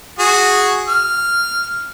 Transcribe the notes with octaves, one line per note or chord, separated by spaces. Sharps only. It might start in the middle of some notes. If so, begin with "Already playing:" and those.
F#4 G#4
F6